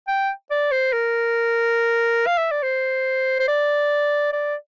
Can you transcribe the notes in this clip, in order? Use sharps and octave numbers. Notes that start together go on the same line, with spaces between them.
G5
D5
C5
A#4
F5
E5
D5
C5
C5
D5
D5